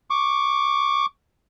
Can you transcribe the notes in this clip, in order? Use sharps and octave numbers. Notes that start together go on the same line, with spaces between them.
C#6 D6